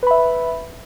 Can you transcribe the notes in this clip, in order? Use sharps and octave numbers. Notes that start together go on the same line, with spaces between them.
B4 E5 B5